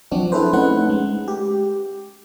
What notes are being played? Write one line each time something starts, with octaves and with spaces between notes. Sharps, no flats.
F3 F#3 C4 D4 F#4
C4 E4 G#4 A4 B4 C5
A3 C#4 D#4 B4 F#5
G#3
G4